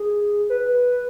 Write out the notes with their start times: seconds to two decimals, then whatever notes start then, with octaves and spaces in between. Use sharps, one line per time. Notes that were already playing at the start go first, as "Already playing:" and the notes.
Already playing: G#4
0.50 B4